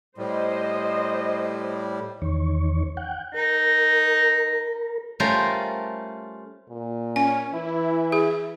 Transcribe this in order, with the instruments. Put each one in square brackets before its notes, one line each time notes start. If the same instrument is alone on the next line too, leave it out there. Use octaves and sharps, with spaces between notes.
[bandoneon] A2 G3 [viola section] C5 D#5
[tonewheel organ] E2 D#3 C#5
F#5 G5
[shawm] D#4 [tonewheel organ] A#4
[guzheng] G3 A3 C#4 F4 A#4 C5
[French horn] A#2
[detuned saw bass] C#4 [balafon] G#5
[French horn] E3 [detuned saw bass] E4
[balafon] G#4